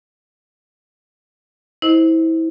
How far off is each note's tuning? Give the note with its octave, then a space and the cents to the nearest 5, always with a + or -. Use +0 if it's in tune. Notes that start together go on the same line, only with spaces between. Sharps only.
E4 -25 C5 +0 D#5 +0